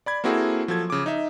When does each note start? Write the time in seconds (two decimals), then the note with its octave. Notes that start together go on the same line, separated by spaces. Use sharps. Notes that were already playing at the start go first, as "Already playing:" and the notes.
0.06 D5 B5 G#6
0.24 A#3 C4 E4 F#4 G#4 A4
0.68 F3 F#3 A4 G#6
0.90 C#3 D6
1.06 D#4 E5